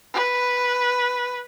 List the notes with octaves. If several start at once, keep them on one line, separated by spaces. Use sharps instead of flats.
B4